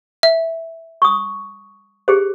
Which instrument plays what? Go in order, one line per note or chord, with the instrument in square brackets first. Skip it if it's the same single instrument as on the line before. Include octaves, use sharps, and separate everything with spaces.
[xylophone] E5
[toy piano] C#6 D#6
G4 G#4 C5